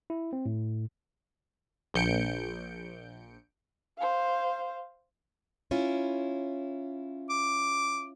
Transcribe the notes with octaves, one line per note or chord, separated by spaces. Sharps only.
E4
C4
A2
A#1 G6 C#7 D7
C5 F5
C#4 E4 F4
D6